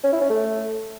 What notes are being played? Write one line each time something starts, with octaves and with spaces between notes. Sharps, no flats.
C#4
E4
C#4
A3